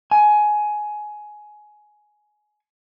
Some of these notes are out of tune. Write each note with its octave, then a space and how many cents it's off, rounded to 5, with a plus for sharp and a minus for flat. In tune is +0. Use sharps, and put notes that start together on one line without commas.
G#5 +15